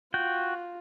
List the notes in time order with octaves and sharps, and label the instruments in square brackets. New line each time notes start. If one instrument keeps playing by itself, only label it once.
[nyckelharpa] F4 [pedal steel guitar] F#4 G5